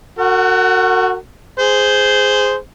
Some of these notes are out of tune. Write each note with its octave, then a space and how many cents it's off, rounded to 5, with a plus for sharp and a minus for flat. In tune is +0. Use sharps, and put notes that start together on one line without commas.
F#4 -10 A#4 -45 F#5 +25
G#4 +0 C5 -10